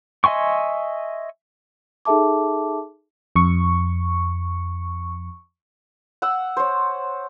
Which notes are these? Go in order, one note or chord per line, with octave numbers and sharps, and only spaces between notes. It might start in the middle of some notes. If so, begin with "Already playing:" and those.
D#5 E5 G#5 C6 C#6
D#4 G#4 A4 E5 A5 D6
F2 C#6
F#5 E6
C5 C#5